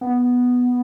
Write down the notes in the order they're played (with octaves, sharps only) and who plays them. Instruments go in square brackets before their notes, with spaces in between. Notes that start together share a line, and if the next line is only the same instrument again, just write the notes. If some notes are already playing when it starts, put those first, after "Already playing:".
[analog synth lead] B3